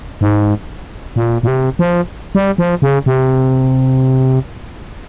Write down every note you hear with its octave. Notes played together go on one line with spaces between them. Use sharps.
G#2
A#2
A#2
C3
F3
G3
F3
C#3
C3